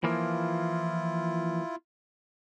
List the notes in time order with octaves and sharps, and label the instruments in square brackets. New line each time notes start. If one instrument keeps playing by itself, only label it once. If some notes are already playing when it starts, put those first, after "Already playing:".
[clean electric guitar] E3 F3 A#3 [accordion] E4 F4